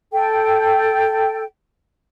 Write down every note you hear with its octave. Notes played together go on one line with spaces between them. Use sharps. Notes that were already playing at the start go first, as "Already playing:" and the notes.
A4 G5